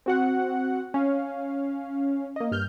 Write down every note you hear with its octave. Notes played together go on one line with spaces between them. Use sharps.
C4 F#4 F#5
C#4 F5
A#3 D#5
G2 F6 G6